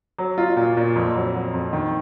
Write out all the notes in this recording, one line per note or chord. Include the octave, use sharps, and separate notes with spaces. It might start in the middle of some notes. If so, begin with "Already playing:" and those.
F#3
F4
A#2
A#2
F2
F#3
F#3
F2
D#3